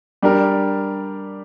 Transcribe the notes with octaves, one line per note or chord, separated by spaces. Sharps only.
G3 D4 G4 A#4